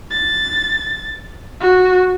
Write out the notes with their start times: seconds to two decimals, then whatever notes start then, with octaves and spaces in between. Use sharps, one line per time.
0.11 A6
1.61 F#4